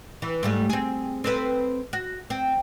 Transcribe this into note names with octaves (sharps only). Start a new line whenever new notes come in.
E3
G#2 G3 A3
C4 G#4
C4 A4 B4
F#4
C4